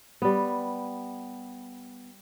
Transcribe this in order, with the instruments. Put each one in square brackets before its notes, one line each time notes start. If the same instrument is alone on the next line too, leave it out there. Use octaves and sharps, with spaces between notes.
[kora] G3 B3